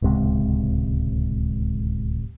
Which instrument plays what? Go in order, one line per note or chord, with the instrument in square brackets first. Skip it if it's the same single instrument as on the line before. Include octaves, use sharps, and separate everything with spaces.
[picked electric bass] D1 C#2 C3 G#3